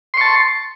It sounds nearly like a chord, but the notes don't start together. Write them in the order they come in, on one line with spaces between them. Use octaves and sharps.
C6 C#6 A5